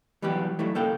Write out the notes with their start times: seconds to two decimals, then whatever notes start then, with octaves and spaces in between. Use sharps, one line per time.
0.22 E3 F#3 G3 B3 G4
0.59 F#3 G3 A3 E4
0.75 C#2 A#3 A4 A#4 G5